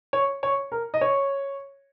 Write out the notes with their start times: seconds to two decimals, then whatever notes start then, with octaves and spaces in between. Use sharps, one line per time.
0.13 C#5
0.43 C#5
0.72 A#4
0.94 D#5
1.01 C#5